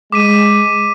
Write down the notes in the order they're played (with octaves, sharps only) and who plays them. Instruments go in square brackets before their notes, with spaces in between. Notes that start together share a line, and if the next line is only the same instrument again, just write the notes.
[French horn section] G#3 [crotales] D6 B6 D#7